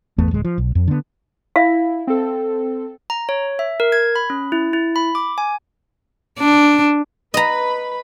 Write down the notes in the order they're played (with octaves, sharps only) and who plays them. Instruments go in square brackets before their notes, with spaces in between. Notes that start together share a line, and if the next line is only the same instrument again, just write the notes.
[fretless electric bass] G#1 E2 A3 B3
D1 G#3
F3
B1
F2
D3 B3
[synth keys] E4 [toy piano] E5 F5
[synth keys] C4 A4
[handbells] A#5
C#5
E5
A#4
G#6
B5
C#4
E4
E4
B5
D6
G#5
[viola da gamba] D4
[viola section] B4 B5 [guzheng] D#5 A#5